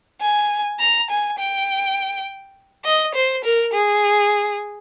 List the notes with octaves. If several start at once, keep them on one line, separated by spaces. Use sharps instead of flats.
G#5
A#5
G#5
G5
D#5
C5
A#4
G#4